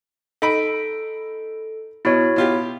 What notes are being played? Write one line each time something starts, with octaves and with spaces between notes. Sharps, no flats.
D#4 A4 B5 D7
B2 E4 F#4 C#5
B2 F4 G4